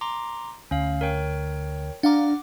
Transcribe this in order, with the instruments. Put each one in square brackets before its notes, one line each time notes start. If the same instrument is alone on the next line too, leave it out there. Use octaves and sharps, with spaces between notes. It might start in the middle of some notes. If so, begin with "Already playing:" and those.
[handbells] A#5 C6 D6
[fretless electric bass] D2 [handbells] C#4 F5
[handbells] A#4 C#5 G5
[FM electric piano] D4 F5 A#5 [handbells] F#5 D6